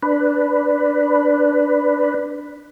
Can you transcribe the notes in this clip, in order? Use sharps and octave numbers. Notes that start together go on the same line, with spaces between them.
D4 B4